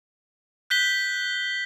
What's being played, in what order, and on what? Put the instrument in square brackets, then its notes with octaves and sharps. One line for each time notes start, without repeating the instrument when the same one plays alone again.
[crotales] F#6 G6 B6 G7